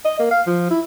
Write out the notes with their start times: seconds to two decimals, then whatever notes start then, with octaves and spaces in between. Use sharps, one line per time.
0.05 D#5
0.19 A#3
0.31 F5
0.47 F3
0.71 E4